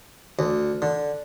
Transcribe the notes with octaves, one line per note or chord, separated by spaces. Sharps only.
D2
D3